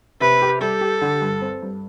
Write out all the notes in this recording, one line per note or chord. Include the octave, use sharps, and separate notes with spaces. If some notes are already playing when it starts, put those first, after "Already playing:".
C3 B4
G4
G3 A4
G4
D3
G2
C4
G2